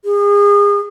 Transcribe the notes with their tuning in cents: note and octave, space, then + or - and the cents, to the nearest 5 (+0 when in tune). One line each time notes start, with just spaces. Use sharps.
G#4 -35